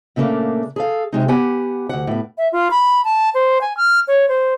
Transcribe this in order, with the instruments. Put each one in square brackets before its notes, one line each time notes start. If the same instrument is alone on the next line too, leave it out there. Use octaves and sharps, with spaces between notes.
[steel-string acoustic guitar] A#2 C#3 A3 A#3 D4
G#4 A4 F5
C3 G#3 D#4
B3 G4 F#5 G#5
D2 F#5
A2 B3
[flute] E5
F4
B5
A5
C5
G#5
F6
C#5
C5